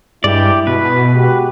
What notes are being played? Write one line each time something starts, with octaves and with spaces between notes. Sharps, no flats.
G2 G#3 E4 G4 D5
B2 B4
G#3 F#4 G4